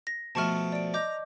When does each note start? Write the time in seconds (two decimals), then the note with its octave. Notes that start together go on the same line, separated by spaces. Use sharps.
0.07 A#6
0.35 B2 F3 A3 A5 C#6 F6
0.72 D5 D7
0.94 D#5 A#5 D6 G6